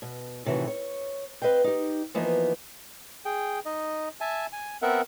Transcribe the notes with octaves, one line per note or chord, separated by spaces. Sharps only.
B2
A2 C3 D#3 E3 F#4
C#5
C4 B4 D#5 F5 G5
D#4 G4
E3 F3 A#3 B3 D#4
G#4 G5
D#4 D#5
E5 G#5 A5
G#5
B3 C4 A#4 E5 F#5